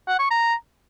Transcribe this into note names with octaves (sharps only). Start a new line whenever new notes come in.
F#5
C#6
A#5